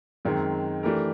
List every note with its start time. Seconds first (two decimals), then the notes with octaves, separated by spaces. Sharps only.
0.25 F#2 D#3 G#3 C4
0.83 E3 A3 D4 G4 A#4